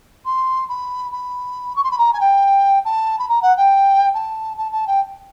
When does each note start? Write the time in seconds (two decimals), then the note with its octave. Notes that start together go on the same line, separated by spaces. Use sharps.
0.25 C6
0.69 B5
1.11 B5
1.76 C#6
1.83 C6
1.91 B5
1.98 A#5
2.13 G#5
2.20 G5
2.85 A5
3.19 B5
3.28 A#5
3.42 F#5
3.57 G5
4.14 A5
4.57 A5
4.72 A5
4.87 G5